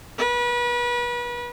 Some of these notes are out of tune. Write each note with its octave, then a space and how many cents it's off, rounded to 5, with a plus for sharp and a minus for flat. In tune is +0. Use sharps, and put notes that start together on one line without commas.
B4 -35